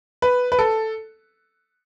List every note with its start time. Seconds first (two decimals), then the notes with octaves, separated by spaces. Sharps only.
0.22 B4
0.52 B4
0.59 A4